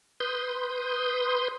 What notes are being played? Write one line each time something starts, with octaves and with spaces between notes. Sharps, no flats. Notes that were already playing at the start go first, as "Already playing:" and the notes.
B4 C6 D#6 G6